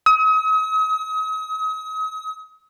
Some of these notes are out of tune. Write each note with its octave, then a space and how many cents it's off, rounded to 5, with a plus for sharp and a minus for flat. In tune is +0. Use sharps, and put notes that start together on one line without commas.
D#6 +40